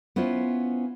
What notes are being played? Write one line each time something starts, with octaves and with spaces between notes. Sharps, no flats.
B3 C#4 E4 F4 C5